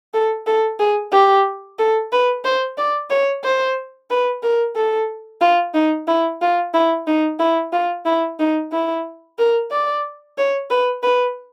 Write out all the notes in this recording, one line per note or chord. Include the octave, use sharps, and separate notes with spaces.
A4
A4
G#4
G4
A4
B4
C5
D5
C#5
C5
B4
A#4
A4
F4
D#4
E4
F4
E4
D#4
E4
F4
E4
D#4
E4
A#4
D5
C#5
B4
B4